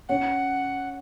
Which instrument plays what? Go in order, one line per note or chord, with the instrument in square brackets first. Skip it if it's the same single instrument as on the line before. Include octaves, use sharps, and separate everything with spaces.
[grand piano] C#4 [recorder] F#5